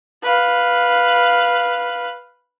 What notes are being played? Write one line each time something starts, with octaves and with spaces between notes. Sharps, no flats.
B4 F5